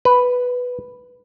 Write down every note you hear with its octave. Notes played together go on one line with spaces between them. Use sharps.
B4